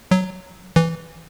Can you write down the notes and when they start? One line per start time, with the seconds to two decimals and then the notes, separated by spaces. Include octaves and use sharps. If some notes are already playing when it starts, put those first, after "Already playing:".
0.11 F#3
0.76 E3